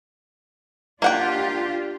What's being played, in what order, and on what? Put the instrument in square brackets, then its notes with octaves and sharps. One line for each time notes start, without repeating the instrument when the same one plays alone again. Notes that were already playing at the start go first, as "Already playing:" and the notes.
[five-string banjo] A#3 F#5 G5 [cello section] D4 F4 G4